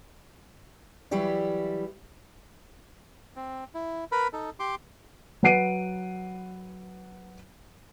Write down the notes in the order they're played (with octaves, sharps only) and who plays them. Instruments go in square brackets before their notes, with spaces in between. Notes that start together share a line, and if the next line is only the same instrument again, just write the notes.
[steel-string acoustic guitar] E3 F#3 G3 E4 G4 D5
[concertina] C4
E4
A#4 B4 B5
D#4 A4
G4 C6 D6
[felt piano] F#3 B4 F#5 C7 D7 D#7